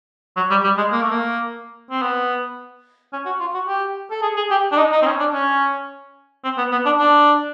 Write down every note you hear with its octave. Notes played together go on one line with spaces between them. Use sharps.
F#3
G3
G3
G#3
A#3
A3
A#3
C4
B3
C#4
F#4
F4
F#4
G4
A4
G#4
G#4
G4
D4
D#4
D#4
C4
C#4
D4
C#4
C4
B3
B3
D4
D4